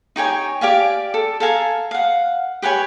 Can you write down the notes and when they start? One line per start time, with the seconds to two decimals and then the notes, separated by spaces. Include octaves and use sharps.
0.16 D#4 G4 C#5 G#5
0.61 G4 D5 F5 G#5
1.14 A4
1.40 A4 F5 G#5 A#5
1.91 F5 F#5
2.62 G4 B4 C#5 G#5